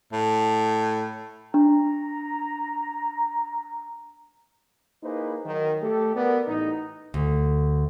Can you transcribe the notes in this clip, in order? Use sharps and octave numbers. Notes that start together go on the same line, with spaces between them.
A2
D4 A#5
A#3 D#4 E4 G#4 B4 C5
D#3 F#3
A3 G4 A4
B3 A#4 D5
A1 D#4
D2